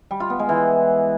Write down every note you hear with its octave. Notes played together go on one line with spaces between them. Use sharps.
G3
F4
B3
G#3
E3